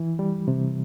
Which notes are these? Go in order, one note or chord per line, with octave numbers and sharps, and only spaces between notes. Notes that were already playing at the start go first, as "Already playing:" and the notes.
Already playing: E3
G3
C3